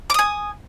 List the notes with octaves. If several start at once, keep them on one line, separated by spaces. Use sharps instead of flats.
G#5 D6 D#6